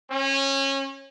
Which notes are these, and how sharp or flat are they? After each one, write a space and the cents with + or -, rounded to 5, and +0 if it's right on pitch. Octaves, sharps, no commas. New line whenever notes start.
C#4 -25